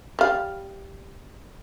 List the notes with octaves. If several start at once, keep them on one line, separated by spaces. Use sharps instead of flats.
G3 F5